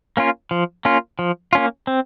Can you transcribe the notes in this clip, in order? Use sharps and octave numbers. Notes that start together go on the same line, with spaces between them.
A#3 C#4 F4
F3
A#3 C#4 F4
F3
A#3 C#4 F4
C4